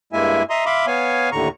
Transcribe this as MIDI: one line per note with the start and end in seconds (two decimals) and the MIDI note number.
0.13 0.43 43
0.13 0.43 56
0.13 0.43 58
0.13 0.43 64
0.13 0.43 76
0.13 0.43 80
0.50 0.65 75
0.50 0.65 76
0.50 0.65 82
0.50 0.65 84
0.50 0.65 87
0.66 0.86 76
0.66 0.86 77
0.66 0.86 83
0.66 0.86 84
0.66 0.86 86
0.87 1.30 59
0.87 1.30 73
0.87 1.30 77
0.87 1.30 80
1.32 1.48 39
1.32 1.48 45
1.32 1.48 50
1.32 1.48 82
1.32 1.48 85